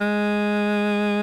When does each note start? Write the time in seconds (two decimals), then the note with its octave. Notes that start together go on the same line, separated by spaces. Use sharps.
0.01 G#3